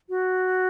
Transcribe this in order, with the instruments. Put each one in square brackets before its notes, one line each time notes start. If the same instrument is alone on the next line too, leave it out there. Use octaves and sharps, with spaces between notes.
[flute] F#4